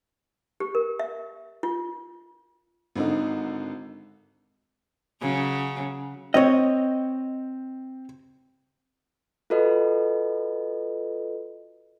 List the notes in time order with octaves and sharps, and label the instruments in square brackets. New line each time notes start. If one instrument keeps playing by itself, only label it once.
[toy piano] G4
A#4
E5
F4
[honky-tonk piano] G#1 D3 D#4
[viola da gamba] C#3 F#3
[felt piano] C4 G5 [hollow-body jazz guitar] C#5 D#5
[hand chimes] F4 F#4 A4 B4 D#5